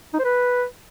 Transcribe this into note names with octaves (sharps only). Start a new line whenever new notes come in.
D#4
C5
B4